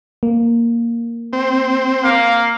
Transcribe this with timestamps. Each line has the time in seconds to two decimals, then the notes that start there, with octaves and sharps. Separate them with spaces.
0.23 A#3
1.33 C4
2.05 A#3 F5